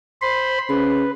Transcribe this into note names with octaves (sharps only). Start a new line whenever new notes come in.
C5 B5 C6
C#3 B4